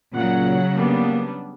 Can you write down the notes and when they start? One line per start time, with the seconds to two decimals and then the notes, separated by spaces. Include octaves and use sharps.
0.14 A#2 C#3 F#3 F#5
0.75 G3 A#3 B3 D4